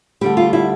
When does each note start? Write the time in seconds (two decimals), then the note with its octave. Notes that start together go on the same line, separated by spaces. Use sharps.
0.21 D2 D3 G3 G4
0.37 F4
0.53 E4